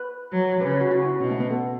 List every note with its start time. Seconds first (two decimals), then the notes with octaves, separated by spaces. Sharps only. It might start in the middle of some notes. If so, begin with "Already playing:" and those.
Already playing: B4
0.32 F#3
0.61 C#3 B4
0.71 B4
0.81 F#4
0.91 F#4
1.05 E4
1.20 B2 C#4
1.30 A3
1.40 B3
1.50 A4